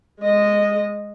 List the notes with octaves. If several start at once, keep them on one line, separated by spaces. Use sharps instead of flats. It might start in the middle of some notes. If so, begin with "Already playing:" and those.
G#3 D#5